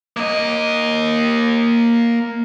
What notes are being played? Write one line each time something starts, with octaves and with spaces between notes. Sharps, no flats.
A#3 D#5